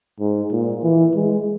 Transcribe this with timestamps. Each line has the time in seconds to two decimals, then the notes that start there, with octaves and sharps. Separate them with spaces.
0.20 G#2
0.52 A#2
0.83 E3
1.15 G#3